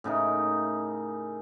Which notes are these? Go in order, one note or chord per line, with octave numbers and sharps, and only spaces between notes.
A2 C#3 D#4 A#4